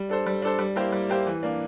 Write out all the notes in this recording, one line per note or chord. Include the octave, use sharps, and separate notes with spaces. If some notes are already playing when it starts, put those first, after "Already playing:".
Already playing: G3
D4 A4 C5
G3
D4 A4 C5
G3
A#3 E4 G4 C5
G3
A#3 E4 G4 C5
E3
A#3 D4